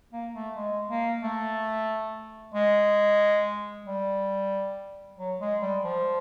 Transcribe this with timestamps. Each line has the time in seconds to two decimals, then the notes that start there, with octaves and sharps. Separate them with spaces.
0.13 A#3
0.34 A3
0.56 G#3
0.89 A#3
1.22 A3
2.54 G#3
3.86 G3
5.18 F#3
5.41 G#3
5.62 G3
5.84 F3